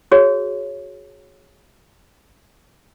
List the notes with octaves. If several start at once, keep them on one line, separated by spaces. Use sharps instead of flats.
F#4 G#4 C#5